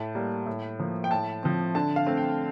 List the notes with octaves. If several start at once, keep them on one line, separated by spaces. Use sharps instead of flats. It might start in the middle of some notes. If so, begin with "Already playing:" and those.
Already playing: A2 A5
G3 A#3
A2
F3 A#3
G5
A2 A5
F3 C4
D3 A5
F5
A3 C4
G5